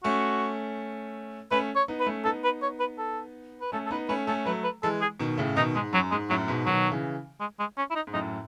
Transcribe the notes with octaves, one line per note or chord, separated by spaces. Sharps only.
A3 C#4 F#4
A3 C#4 B4
C#5
B3 D#4
B4
A3 C#4
B3 D#4 A4
B4
C#5
B4
A4
B4
A3 C#4 A4
A4
B3 D#4 B4
A3 C#4 B4
A3 C#4 A4
F#3 A3 B4
B4
E3 G#3 A4
G#4
B2 D#3
A2 C#3
B2 D#3 D#4
G#2 G#3
F#2 F#3
G#2 G#3
F#2 A2 F#3
G#2 B2
B2 D#3 F#3
C#3 E3
G#3
G#3
C#4
E4
D#4
G#2
F#2 A2 D#4